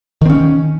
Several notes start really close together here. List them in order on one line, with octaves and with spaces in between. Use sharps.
D#3 C4 C#4